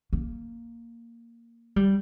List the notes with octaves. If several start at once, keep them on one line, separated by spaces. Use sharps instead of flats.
A#3
G3